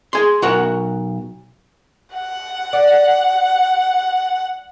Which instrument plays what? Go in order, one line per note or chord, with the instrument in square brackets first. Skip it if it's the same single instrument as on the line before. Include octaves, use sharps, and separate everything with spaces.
[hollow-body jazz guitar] G#4 C6
B1 F#4 A#4 F#5
[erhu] F#5
[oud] D5